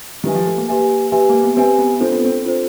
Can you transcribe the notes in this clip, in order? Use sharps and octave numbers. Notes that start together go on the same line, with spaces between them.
D#3 G4 B4 E5 G#5
F3
A3
A#3
G4 B4 E5 G#5
G4 B4 E5 G#5
A#3
B3
C4 G4 B4 E5 G#5
B3
C4 D4 F4 A4 C5
B3
C4
D4 F4 A4 C5